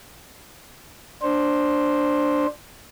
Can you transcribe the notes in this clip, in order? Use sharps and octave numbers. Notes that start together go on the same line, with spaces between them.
D4 C5